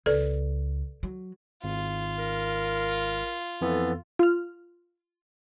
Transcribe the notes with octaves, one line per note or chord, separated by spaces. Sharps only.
C#2 A4 B4 D5
F#3
G#1 F4
A#4
F2 E3 B3 A4
F4 F6